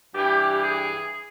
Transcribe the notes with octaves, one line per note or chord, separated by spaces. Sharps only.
G2 E3 G4
G#4